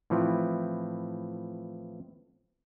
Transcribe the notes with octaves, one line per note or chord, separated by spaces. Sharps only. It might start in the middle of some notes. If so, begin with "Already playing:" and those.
A2 E3 F3 C4 E4